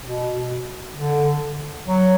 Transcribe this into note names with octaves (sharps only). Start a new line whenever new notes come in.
B2
D3
F#3